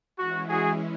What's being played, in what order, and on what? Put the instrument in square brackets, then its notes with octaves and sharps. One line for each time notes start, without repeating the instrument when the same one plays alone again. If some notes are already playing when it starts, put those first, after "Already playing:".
[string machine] E3 G#3 C#4 E4 [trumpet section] F#4
[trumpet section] F#4 G#4